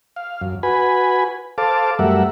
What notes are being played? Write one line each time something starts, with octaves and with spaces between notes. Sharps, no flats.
F5
F#2
F#4 B4 G#5 B5
A4 C5 F5 A5 D6
F#2 G3 A3 A#4 E5 F#5